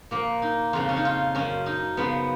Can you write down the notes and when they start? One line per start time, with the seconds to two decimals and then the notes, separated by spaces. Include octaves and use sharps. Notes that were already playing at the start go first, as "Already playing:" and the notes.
0.11 A#2 F3 A#3
0.42 D#4
0.73 F2 C#3 F3 F4
0.89 C#4
0.97 D#4
1.05 F4
1.35 F#2 F3 C#4
1.66 D#4
1.97 F#2 C#3 F3 B3